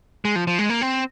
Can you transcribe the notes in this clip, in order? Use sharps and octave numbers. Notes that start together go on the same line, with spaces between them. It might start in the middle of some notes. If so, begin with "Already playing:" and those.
G#3
F3
F3
G#3
A#3
C4